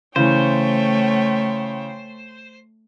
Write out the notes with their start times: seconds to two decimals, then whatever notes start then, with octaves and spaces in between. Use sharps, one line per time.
0.16 C#3 E3 A3 C5 C#5 G5